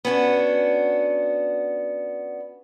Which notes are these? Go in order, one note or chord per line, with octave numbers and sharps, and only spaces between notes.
B3 C#4 D4 F#4